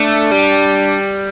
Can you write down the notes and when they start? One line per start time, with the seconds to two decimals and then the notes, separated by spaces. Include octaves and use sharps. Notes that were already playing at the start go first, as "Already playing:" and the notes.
Already playing: A3 D4
0.32 G3